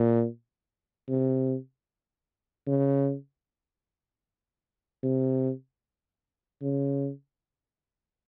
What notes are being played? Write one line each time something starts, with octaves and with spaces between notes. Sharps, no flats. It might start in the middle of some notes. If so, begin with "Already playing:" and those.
Already playing: A#2
C3
C#3
C3
C#3